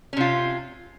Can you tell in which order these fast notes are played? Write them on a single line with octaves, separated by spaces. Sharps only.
C#4 C3 F4